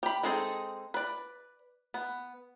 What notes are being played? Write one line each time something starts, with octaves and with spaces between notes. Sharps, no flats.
G4 B5
G#3 C4 D#4 G#4 A4
B4 D5
B3